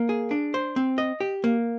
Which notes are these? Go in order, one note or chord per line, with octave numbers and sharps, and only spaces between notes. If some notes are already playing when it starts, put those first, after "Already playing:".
Already playing: A#3
G#4
D4
C5
C4
D#5
G4
A#3